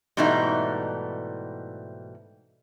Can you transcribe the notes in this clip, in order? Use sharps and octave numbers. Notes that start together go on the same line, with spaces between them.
G#2 B2 E3 G3 A3 D#4